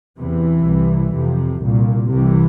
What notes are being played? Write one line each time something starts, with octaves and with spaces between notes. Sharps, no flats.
E2 C3 E3
C2 C3
F2 C3
C2 A#2
C2 C3 E3